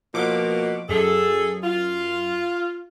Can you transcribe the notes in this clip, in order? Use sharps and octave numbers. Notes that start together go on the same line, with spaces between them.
B2 F3 A#3 D6
F#2 G#4 A4
F4